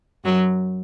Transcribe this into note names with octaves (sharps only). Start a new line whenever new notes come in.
F#2 F#3